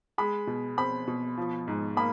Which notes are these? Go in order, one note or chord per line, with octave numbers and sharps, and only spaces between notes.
G#3 B5
B2
C4 B5
B2
F3
G#2
A#3 B5